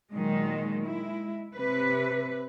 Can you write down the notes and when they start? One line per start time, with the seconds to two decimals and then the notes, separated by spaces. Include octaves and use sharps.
0.14 A#2 D#3 F#3 G#3
0.86 G#3 E4
1.54 C3 B4